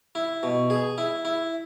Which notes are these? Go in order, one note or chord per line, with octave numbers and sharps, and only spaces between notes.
E4
B2
G#4
E4
E4